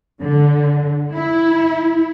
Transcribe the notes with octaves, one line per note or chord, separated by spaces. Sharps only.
D3
E4